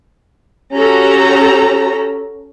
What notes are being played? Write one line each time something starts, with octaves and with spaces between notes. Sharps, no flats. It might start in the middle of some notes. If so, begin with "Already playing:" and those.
C#4 F#4 G4 A4 A#5